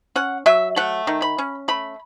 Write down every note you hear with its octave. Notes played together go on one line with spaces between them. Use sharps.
C#4 F#5
F#3 E5
A3 F#5
D#3
B5
C#4
A3 B5